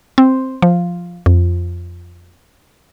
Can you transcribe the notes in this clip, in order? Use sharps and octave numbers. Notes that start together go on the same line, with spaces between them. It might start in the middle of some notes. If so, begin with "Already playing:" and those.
C4
F3
F2